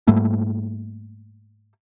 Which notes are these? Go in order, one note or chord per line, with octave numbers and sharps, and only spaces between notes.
G#2 G3 A3 A#3